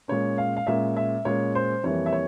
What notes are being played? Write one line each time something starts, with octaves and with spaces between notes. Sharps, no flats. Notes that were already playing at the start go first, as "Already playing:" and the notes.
A#2 G#3 C#4 C#5
F5
F5
A#2 G#3 C#4 E5
E5
A#2 G#3 C#4 C#5
C5
F2 E3 G3 A#3 C#5
E5
C#5